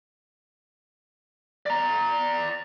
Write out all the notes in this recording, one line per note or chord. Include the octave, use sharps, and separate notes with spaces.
D5 A#5